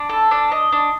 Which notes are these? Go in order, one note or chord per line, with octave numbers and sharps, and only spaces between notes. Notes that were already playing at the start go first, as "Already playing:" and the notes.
Already playing: D4
A4
D4
D#5
D4